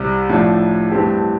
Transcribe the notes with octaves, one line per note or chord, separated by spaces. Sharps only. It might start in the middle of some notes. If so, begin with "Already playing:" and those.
Already playing: C2 C3 G3
A2 F3 A3 D4
G2 E3 A3 C4 G4